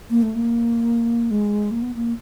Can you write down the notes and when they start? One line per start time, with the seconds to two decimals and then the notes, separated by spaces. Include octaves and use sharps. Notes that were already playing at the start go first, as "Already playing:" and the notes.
0.10 A#3
0.22 A3
0.35 A#3
1.31 G#3
1.71 A#3
1.82 B3
1.95 A#3